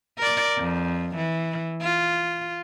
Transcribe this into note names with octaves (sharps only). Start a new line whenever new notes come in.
A#4 D5
F2
E3
F4